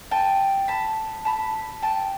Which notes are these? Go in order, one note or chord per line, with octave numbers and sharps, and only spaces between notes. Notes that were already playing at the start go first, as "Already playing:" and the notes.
G5 A5
A5 B5
A5 B5
G5 A5